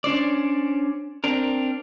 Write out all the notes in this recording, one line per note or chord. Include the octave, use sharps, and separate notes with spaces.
C#4 D4 C5 D5
C4 D4 A#4